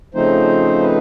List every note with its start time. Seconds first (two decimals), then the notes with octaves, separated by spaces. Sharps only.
0.14 C#3 F3 A3 C4 D#4 C5
0.82 B4